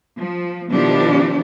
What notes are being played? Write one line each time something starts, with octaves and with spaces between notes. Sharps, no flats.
F3
B2 D#3 F3 D4 E4 G4